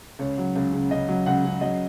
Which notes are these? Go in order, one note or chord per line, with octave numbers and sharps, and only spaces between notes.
C#2 C#5
F#3
C#2
C#3
C#2 D#5
F#3
C#2 F#5
C#3
F#3 D#5